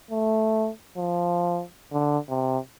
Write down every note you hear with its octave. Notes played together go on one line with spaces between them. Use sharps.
A3
F3
D3
C3